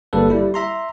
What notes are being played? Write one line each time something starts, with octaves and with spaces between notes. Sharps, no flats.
G1 G3 A#3 A4 B4
G3 E4
E5 A#5 C6